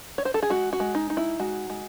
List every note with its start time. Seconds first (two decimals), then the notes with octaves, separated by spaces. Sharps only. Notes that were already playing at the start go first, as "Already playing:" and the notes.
0.18 C#5
0.25 C5
0.34 A4
0.42 G#4
0.50 G#3 F#4
0.73 F#4
0.80 G#3
0.95 D#4
1.10 D#4
1.17 E4
1.40 G#3 F#4
1.70 G#3